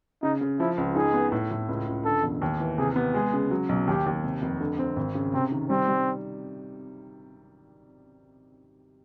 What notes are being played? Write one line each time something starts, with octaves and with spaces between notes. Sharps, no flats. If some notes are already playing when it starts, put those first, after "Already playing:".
C#3 D#4
C#3
F3 E4
C#2
D#4 G#4
B3
A2
A2
C#2
C#2
D3 A4
E1
D#2
E3
C3 G#4
B3
G#3 G#4
C#3
F#3
B1
D#2 G4
D#2
C3
F1
D3
C4
G#1
C#3
C3 C4
D#3
G3 C4
G3